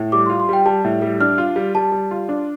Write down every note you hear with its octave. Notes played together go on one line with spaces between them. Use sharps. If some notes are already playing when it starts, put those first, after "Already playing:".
Already playing: A2
G3 D6
C6
F4
C6
G3 G5
G3 A5
A2
G3
D4 F6
F4
G3
G3 A5
G3
F4
D4